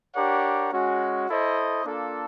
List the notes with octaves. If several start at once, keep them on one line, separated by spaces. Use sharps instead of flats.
D4 G4 A#4 C#5 F#5
G#3 C#4 F#4
E4 A4 C5 D#5
A#3 D4 F4 A4